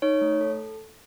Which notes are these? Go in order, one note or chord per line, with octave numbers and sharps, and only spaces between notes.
D#4 C#5
A3
A4